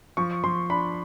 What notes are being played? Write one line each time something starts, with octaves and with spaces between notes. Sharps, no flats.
F3 C#6
F3 C6
D4 B5